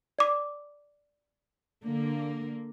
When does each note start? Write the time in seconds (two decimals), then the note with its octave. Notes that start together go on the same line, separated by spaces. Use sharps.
0.19 D5 D6
1.83 D3 A#3